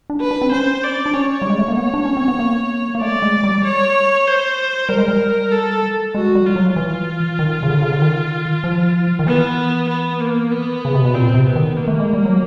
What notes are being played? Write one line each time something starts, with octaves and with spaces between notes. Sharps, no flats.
D4
B4
D4
C4
C#4 C5
D5
D4
C#4 C#5
G3
G#3
A3
A#3
B3 C#5
D4
C#4
C4
B3
A#3
A#3
A3 D5
G#3
G3
C#5
C5
G3 A#4
G#3
G3
A4
G#3 F#4
G3
F4
F#3
E3 F4
D#3
C#3
D3
C#3
D3
D#3
F3
D#3
E3 B3
B3
A#3
B3
C#3
C3
B2
A#2 C4
C3
B3
D#3
A#3
A3
G#3
G3
F#3